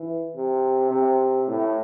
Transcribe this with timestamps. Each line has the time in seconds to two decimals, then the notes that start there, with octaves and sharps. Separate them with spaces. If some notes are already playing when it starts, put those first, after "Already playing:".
Already playing: E3
0.35 C3
0.91 C3
1.47 A2